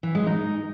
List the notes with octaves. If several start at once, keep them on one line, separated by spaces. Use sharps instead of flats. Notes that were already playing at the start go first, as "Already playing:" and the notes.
E3
G#3
D#4